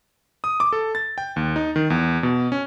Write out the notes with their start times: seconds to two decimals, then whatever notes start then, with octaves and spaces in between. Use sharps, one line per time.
0.44 D#6
0.60 D6
0.73 A4
0.95 A6
1.18 G5
1.36 D#2
1.56 D#4
1.76 D#3
1.90 E2
2.23 B2
2.52 C#4